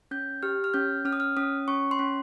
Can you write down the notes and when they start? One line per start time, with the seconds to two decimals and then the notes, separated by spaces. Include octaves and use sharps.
0.11 C#4 G6
0.43 G4 F6
0.64 F6
0.74 C#4 G6
1.05 C#4 F6
1.13 D#6
1.20 F6
1.37 C#4 D#6
1.68 C#4 C#6
1.91 C6
1.99 C#4